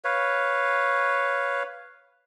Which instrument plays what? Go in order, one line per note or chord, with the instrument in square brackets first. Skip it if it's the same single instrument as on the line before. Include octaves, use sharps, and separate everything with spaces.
[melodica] B4 C#5 F5